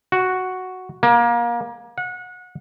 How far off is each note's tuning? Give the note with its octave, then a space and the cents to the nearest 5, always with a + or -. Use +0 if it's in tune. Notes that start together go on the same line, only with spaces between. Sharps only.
F#4 +0
A#3 +25
F#5 -30